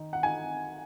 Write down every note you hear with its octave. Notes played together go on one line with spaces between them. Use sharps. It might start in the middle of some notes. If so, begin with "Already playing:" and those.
Already playing: D#3 D#4
F#5
D#4 G#5